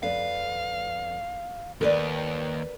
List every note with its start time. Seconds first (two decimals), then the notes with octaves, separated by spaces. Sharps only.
0.03 F2 B4 D5 F5
1.81 D#2 A#4 B4 D5